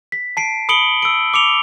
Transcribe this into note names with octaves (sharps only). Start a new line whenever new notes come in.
B6
A5 C7 D7
B5 D#6 C#7 D7 F#7 G7
E6 D7
D6 C#7 F7 G7